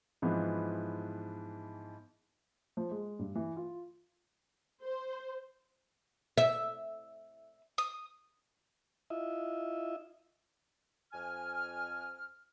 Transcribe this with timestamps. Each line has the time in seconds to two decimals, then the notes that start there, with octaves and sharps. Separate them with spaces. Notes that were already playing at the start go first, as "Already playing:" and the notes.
0.22 G#2 E3 F3 B3
2.77 F3
2.91 G#3
3.19 G2
3.35 E3
3.57 F4
4.83 C5
6.38 E5
7.78 D#6
9.10 E4 F4 D#5 E5
11.12 F2 G#5 F6